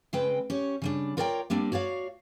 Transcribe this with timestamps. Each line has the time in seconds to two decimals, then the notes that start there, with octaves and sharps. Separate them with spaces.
0.13 C#3 G#3 C4 B4 G5
0.50 C#4 G4 C#5
0.82 C#3 G3 D4
1.17 F4 A#4 C#5 D5 E5 G5
1.50 G3 A#3 C4 D4
1.72 F#4 C#5 D5 F5